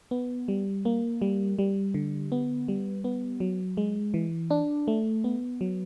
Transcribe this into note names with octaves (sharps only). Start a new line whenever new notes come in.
B3
G3
A#3
G3
G3
D3
B3
G3
B3
F#3
G#3
E3
D4
A3
B3
F#3